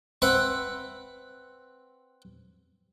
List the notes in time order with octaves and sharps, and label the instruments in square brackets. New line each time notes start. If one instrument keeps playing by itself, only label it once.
[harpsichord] C4 B4 E5 F#5